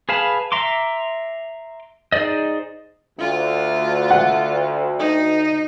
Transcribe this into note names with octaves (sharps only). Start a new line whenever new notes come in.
G#4 B4 F5 A5 B5
E5 A#5 C6 D6
D#4 G#4 C5 D5 D#5
D2 F4
F#5
D#4